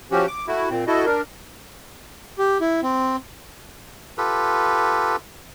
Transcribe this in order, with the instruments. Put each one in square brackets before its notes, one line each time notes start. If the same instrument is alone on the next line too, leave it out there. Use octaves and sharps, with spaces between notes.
[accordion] F3 C#4 F#4 G4
D6
A3 E4 F#4
A#2 C4
E4 F#4 A4 D#5
D4 A#4
[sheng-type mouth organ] G4
E4
C4
[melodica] F4 G4 A4 B4